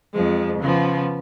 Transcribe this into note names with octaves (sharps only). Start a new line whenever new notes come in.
F2 F3 G#3
C#3 F3 B3